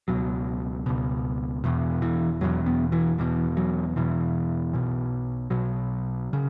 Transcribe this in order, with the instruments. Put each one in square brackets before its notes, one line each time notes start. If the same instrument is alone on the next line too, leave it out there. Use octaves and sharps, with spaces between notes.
[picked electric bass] C#2 B2 F#3
C#2 B2
E1 E2 B2
E3
E1 E2 B2 F#3
B3
E3
E1 E2 B2 E3
F#3
E1 E2 B2 E3
B1 B2
B1 B2 F#3
C#3